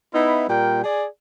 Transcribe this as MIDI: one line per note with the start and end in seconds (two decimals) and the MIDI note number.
0.13 0.45 59
0.13 0.45 63
0.13 0.45 64
0.48 0.82 46
0.48 0.82 55
0.48 0.82 70
0.48 0.82 79
0.83 1.05 68
0.83 1.05 74
0.83 1.05 80